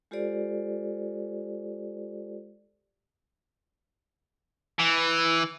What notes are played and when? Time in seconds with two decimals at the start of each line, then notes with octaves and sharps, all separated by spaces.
0.11 G#3 F4 G4 A4 C5 D5
4.80 E3